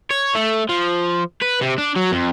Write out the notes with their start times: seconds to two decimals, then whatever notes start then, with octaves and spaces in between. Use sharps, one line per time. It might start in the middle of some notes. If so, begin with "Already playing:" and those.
0.10 C#5
0.35 A3
0.69 F3
1.42 B4
1.62 C3
1.78 D4
1.96 F#3
2.12 F2